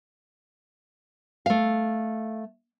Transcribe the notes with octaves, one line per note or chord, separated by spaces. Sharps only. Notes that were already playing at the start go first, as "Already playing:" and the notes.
A3 F5